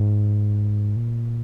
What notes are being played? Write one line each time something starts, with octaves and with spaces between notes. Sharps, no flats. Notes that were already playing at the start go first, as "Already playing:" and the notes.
Already playing: G#2
A#2